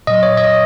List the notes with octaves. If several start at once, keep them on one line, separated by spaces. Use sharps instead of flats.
A#2 F#3 D#5
C#5
D#5